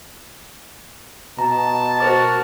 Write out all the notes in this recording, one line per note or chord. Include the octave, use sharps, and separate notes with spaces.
B2 A5 A#5
F#4 A#4 C5 D6 A6